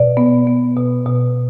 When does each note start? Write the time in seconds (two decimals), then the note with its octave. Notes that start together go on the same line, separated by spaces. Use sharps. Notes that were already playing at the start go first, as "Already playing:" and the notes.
Already playing: B2 D5
0.17 B3
0.47 B3
0.77 B2
1.06 B2